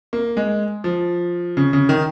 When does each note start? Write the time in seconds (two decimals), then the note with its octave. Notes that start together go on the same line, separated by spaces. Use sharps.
0.13 A#3
0.37 G#3
0.84 F3
1.57 C#3
1.73 C#3
1.89 D#3